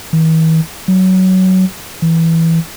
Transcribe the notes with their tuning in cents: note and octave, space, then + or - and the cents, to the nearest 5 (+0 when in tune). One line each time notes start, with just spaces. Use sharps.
E3 -45
F#3 +15
E3 -5